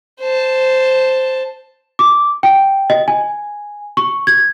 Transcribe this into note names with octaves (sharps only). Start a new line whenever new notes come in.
C5 A5
D6
G5
D#5
G#5
C#6
G#6